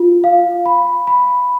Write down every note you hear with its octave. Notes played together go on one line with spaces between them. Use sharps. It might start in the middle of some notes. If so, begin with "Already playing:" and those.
Already playing: F4
F5
B5
B5